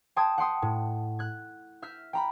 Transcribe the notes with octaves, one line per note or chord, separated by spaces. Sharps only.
G5 A5 C6 D#6 G#6
F#5 G5 C6 D#6
A2
F#6 G#6
E5 F6 G6 B6
G5 A#5 B5